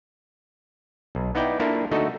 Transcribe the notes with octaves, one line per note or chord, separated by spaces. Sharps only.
B1
B3 D#4 E4 D5 G5
A#3 D4 E4 F4 A4 A#4
D3 A3 D#4 F#4 A4 D#5